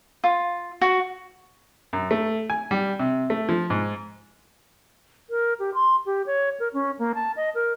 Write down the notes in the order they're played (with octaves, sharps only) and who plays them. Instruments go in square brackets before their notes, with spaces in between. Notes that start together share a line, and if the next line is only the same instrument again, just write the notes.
[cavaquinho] F4
F#4
[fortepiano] F#2
A3
G#5
G3
C3
A3
F3
G#2
[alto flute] A#4
G4
C6
G4
C#5
A#4
C#4
A#3
A5
D#5
A#4